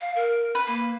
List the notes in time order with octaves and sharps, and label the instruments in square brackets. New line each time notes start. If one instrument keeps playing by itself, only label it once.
[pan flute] F5
A#4
[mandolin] B4
[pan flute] A#3